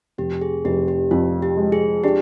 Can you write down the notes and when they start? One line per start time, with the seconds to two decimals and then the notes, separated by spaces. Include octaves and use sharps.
0.18 F1 G4
0.41 G#4
0.64 F1 G4
0.88 G4
1.11 F2 F4
1.42 G4
1.57 G#3
1.72 G#4
2.04 D4 G4